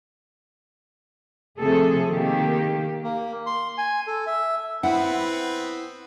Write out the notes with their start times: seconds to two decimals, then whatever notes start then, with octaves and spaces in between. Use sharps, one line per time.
1.59 C3 F3 A3 G#4 A4
2.10 D#3 A#3 G4
3.04 A#3
3.46 C6
3.78 G#5
4.07 A4
4.27 E5
4.83 B3 C4 E4 F#5